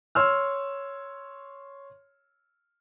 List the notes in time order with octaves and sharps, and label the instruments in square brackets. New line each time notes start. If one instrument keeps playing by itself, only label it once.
[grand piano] C#5 C6 E6 F6